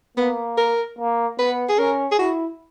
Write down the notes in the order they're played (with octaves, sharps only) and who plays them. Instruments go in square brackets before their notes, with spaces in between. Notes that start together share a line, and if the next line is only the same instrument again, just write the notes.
[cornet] A#3 [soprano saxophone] B3
[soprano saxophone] A#4
[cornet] A#3
[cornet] B3 [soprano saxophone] B4
[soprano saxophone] G#4
[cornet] C#4 [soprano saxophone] A#4
[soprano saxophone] G#4
[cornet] E4 [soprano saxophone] F#4